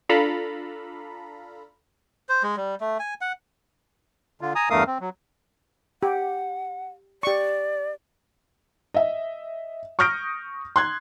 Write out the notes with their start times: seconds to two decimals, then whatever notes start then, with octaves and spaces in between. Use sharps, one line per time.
0.09 D4 F4 A4 F5 A#5 B5
2.29 C5
2.43 G#3
2.57 G3
2.81 A3
3.00 G#5
3.21 F#5
4.41 D3 F4
4.55 G#5 A#5 D#6
4.70 E2 G2 A3 A#4 F5 D#6
4.87 C4
5.00 F#3
6.03 G4 F#5
7.23 G4 D5 C#6
8.94 D#5 E5
9.99 C#6 D#6 F6 G6 A#6 D7
10.76 C6 F#6 G#6